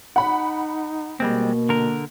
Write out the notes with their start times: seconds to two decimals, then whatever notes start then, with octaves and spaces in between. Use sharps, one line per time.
0.16 D#4 F#5 B5
1.20 B2 G3 G#3 A#3 C4
1.69 D3 A#4